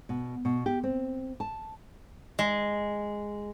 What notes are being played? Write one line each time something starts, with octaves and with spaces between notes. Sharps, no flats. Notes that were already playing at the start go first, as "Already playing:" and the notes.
B2
B2
G4
C4
A5
G#3